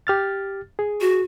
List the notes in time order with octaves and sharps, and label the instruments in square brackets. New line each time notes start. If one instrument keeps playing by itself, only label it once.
[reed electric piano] G4 F6 A6
G#4
[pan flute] F#4